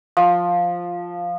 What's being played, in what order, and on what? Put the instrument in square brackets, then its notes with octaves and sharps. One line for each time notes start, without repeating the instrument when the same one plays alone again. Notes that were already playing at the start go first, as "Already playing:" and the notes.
[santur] F3